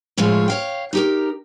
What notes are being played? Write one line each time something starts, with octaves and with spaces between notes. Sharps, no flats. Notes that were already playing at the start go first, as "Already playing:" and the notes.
A2 F3 G#3 C#4 F4
C#5 F5 G5
D#4 G4 A#4